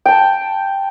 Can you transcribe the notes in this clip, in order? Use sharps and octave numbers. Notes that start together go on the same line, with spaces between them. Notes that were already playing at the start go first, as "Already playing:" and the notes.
G5 A5